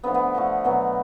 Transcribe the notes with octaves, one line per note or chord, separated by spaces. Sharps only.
D3 F3 A3 B3
B3
D3 F3 A3
B2 F#3 B3